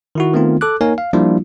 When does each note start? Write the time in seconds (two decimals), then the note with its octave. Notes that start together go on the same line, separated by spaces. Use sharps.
0.15 D#3 E4 F#4
0.33 D#3 A3 B3 C4 F4
0.61 A4 D6 F#6
0.81 A#3 D#4 A#4 C#5 G#5
0.98 F5
1.13 F3 G3 A#3 D4 E4 F4